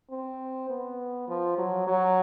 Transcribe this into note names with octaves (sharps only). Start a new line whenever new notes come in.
C4
B3
F3
F#3
F#3